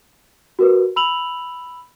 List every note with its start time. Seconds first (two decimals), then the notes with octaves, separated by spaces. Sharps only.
0.59 F#4 A#4 B4
0.96 B5 E6 F7 F#7